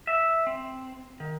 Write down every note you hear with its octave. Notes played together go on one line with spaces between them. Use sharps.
E5
C4
D#3